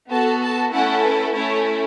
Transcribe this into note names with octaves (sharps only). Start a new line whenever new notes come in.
B3 F#4 A4 A5
A5
A3 C#4 E4 A4 F#5
B4
A3 C#4 E4 A4 C#5